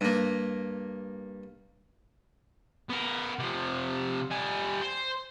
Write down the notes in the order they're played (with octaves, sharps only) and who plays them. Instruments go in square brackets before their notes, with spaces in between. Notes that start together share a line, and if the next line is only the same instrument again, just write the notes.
[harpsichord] G2 A#3
[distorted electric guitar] B3 A#4
C3 F3
G3 G#5
C5